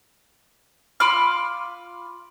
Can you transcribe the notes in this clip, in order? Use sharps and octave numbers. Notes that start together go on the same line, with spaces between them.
F4 B5 D6 F6